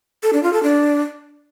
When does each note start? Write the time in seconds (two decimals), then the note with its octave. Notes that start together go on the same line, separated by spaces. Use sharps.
0.23 A4
0.33 D4
0.43 F4
0.53 A4
0.63 D4